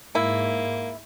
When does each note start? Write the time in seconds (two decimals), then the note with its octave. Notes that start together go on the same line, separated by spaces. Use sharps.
0.15 G#2 A#3 E4